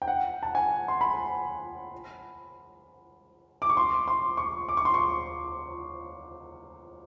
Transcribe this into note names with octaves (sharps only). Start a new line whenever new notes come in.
G5
F#5
A5
G#5
C6
B5
D6
C#6
C6
C6
C#6
D6
C#6
C6
C#6